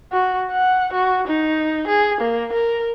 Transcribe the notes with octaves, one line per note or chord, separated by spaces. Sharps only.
F#4
F#5
F#4
D#4
G#4
A#3
A#4